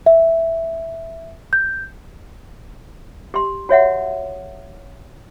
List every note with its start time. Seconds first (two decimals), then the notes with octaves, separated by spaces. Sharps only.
0.06 E5
1.53 G6
3.34 G4 C6
3.69 F#4 C#5 E5 F#5